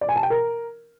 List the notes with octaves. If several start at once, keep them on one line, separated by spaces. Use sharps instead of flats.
D5
G#5
A5
G5
A#4